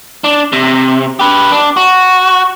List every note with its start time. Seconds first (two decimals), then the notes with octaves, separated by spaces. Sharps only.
0.24 D4
0.53 C3
1.19 G4 B4
1.52 D4
1.77 F#4